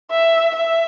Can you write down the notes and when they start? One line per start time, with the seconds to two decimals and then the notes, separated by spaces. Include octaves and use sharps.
0.11 E5
0.55 E5